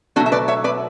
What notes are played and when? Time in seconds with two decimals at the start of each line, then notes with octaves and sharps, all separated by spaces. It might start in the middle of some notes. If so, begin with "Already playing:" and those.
0.16 B2 F#3 A3 D4 F#4
0.26 E5
0.32 B4 D5
0.48 C#5 E5
0.64 B4 D5